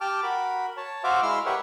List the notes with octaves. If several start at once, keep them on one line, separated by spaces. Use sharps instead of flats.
G4 G5 A5 D6 F6
F#4 A#4 B5
C#5 A5
F#4 C5 E5 F5 D6
G#3 E4 C6 E6 F6
G4 A#4 B4 C#5 E5 F#5